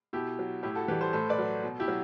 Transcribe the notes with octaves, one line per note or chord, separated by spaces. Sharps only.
B2 E4 G4
F#3
A2 E4 G4
F#4 A4
E3 G3 G4 B4
A4 C5
A2 A4 C5
B4 D5
F#3
B2
E4 G4
F#3